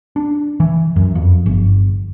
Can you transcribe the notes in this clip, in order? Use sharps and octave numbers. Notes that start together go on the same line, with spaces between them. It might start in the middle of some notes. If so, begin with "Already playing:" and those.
D4
E3
F#2
F2
G1